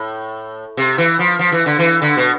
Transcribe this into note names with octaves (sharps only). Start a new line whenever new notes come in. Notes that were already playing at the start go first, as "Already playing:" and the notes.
Already playing: A2
C3
E3
F3
F3
E3
D3
E3
D3
B2